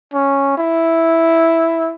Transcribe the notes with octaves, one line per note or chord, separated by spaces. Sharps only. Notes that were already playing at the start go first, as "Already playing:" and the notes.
C#4
E4